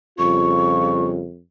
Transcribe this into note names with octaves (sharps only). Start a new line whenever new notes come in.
F2 C#3 G3 F4 C#6